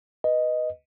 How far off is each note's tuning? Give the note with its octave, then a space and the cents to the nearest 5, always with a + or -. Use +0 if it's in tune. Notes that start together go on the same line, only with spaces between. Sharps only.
B4 +0 D#5 +0